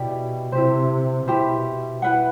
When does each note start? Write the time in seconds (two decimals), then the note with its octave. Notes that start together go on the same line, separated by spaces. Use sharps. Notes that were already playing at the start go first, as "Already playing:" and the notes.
Already playing: B2 E4 G4 D5
0.52 C3 E4 G4 C5
1.27 B2 E4 G4 C5
2.02 E4 B4 F#5